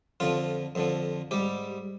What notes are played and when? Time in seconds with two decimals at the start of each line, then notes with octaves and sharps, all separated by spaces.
0.20 F2 D3 F3 F4
0.75 F2 D3 F3
1.31 G#2 G3 G4